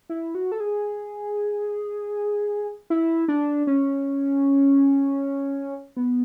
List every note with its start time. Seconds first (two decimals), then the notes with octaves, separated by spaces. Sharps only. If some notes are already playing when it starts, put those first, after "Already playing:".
0.10 E4
0.35 F#4
0.52 A4
0.60 G#4
2.90 E4
3.28 D4
3.67 C#4
5.97 B3